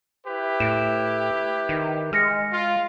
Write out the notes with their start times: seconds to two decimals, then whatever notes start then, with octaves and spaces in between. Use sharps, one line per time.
0.26 E4 G4 B4
0.60 A2 B6 D7 E7
1.69 D#3
2.13 G#3 F6 A#6 C#7
2.52 F4